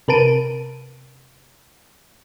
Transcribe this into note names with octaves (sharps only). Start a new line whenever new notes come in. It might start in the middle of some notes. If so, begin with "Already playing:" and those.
C3 A#4 B4 A5 D7 D#7